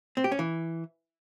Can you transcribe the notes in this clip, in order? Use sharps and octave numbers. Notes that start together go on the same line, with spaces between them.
C4
G4
C#4
E3